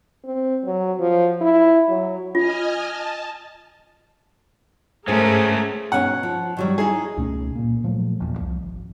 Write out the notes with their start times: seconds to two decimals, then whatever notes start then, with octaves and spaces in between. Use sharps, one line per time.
0.24 C4
0.64 F#3
1.00 F3
1.41 E4
1.88 F#3
2.35 F4 D#5 G#5 F6
2.86 A5
5.08 G#2 G#3 A3 C#4 G#4 A#4 C5
5.92 B2 C#4 D#4 F#5
6.23 F3
6.57 D#3 F#3 G3
6.78 D#4 E4 G#4
7.17 C#2 B2 A3 C#4
7.55 A#2 A#3
7.83 A#2 F3 F#3 A3
8.20 F1 E2 A#2
8.38 C2 F3
8.63 G#1